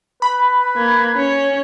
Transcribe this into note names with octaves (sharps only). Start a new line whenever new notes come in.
B4 B5
A#3 G#6
C#4 C#5